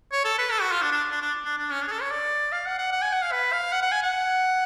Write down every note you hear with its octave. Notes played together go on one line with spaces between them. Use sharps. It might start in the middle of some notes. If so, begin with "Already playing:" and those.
C#5
A4
B4
A4
F#4
F4
D4
D4
D4
D4
D4
D4
C#4
D4
G#4
A4
C#5
D5
F5
F#5
F#5
F#5
G#5
F#5
F5
B4
F5
F#5
F#5
G#5
F#5